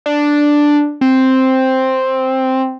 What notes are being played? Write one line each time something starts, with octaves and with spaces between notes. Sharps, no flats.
D4
C4